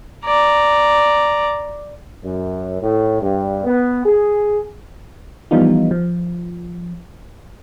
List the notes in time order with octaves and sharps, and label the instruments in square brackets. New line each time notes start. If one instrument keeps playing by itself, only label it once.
[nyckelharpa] D5 A#5
[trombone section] F#2
A2
G2
B3
G#4
[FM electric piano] E3 F3 G3 B3 D#4 F4
F3